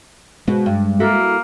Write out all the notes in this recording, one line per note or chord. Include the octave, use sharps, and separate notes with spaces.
B2 G#3
G2
A#3 E4 F#4 A4